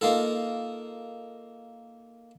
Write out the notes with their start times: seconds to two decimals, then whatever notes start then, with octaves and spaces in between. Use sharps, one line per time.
0.01 A#3 D#4 F4 A4